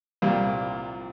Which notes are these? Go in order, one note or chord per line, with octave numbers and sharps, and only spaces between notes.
C2 A#2 G3